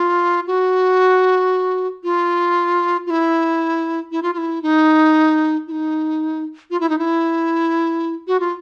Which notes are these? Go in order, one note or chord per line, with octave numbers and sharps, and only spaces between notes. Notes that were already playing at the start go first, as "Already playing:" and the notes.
Already playing: F4
F#4
F4
F4
E4
E4
F4
F4
E4
D#4
E4
D#4
F4
E4
D#4
E4
F#4
F4